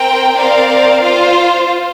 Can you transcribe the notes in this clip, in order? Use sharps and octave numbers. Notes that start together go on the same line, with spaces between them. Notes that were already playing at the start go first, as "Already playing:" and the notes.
Already playing: C4 A#4 G5
C4 A#4 D5 F5
F4 C5 F5